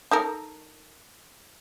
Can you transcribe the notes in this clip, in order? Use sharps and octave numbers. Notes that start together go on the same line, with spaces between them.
D#4 A4 A#4